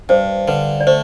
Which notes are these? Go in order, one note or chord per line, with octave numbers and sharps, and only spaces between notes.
G2 C5
D3 B4
D5
A3 C5